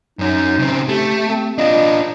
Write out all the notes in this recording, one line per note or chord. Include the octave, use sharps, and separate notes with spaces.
F#2 C#4 D#4
C#3 C4
A3 G4
C4
D4 F4 D#5